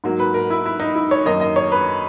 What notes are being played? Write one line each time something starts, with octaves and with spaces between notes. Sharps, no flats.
G#2 F#3 A#3
B4
A#4
E4
E4
D#4
E4
C#5
F#2 D#3 A#3 D#5
D#5
C#5
B4